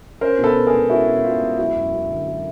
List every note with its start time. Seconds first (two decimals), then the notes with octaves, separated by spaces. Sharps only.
0.21 C#4 A#4 C5
0.38 B2
0.44 A4 B4
0.56 B2
0.67 G#4 A#4
0.73 G#3
0.89 C#4 E4 F#4
1.07 B2
1.24 B2 F4
1.41 G#3
1.58 F#3 E4 F#4
1.76 F#2
1.93 F#2
2.10 D3
2.27 F#3